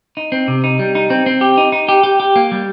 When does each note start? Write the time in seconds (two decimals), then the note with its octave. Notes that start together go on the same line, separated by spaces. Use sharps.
0.17 D#4
0.32 C4
0.48 C3
0.64 D#4
0.79 G3
0.95 D#4
1.10 C4
1.26 C4
1.41 G4
1.57 D#4
1.72 D#4
1.89 G4
2.04 G4
2.20 G4
2.36 A#3
2.52 G3